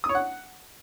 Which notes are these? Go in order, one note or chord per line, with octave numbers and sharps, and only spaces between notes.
D#6
C#5
F#5